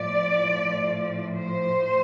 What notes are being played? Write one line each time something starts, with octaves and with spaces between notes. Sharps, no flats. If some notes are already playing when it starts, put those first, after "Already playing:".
Already playing: A2 F3 D5
C5